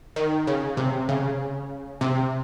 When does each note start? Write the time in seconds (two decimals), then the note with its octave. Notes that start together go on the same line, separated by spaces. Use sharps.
0.16 D#3
0.47 C#3
0.77 C3
1.09 C#3
2.01 C3